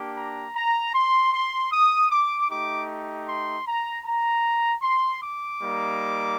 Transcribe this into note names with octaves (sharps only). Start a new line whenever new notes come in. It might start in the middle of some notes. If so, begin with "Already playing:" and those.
Already playing: A#3 D4 G4
A#5
A#5
C6
C6
D#6
D6
A3 D#4 G4 D6
C6
A#5
A#5
C6
D6
G3 A#3 D#4